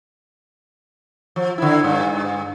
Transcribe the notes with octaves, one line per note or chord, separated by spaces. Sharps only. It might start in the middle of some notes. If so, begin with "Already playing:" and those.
F3
D3 E4
G2